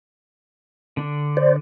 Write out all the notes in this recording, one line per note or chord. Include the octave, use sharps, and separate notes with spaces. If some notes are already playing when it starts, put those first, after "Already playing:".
D3 D4
C5 D5